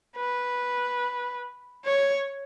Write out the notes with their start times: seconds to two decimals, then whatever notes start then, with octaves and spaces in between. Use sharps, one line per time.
0.17 B4
1.85 C#5